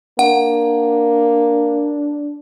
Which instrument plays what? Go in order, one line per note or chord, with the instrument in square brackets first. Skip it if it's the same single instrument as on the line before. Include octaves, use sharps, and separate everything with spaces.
[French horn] A#3 [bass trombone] D4 [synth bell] F#5